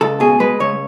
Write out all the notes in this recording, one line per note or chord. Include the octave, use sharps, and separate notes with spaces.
C#2 A4
B2 G#4
G#3 B4
C#2 C#5